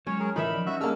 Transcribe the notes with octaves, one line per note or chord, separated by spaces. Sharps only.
F#3 G#3 C#4 C#5
G#4 A#4
A2 E3 D#4 F4 A#4 E5 B5
F3 D5
G3 C#4 F#4 E5
G#3 A#3 D4 E6 F6